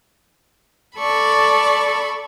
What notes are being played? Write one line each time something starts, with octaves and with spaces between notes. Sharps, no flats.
A4 D5 B5 C#6